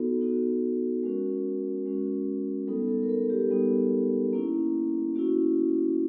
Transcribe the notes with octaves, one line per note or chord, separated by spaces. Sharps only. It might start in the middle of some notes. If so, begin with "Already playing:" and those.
Already playing: B3 D#4 F#4 A4
B3 D#4 F#4
G#3 C#4 F#4 A#4
G#3 C#4 F#4
G3 B3 D#4 A4
A4
A#4
A4
G4
G3 B3 D#4
A#3 C#4 E4
A#3 C#4 E4 F#4